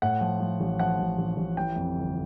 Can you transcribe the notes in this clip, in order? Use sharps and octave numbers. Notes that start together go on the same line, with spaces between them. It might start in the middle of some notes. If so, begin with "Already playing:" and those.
A2 F#5
F3
F3
A1
F3 F#5
A1
A1
A1
E3 G5
F2
G1